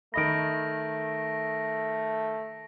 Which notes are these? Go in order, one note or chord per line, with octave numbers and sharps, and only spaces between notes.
D#3 A3 D#5 B5 A#6 D7